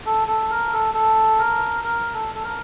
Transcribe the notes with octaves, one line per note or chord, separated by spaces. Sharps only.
A4
A4
A#4
A4
A4
A#4
A#4
A4
A4
A#4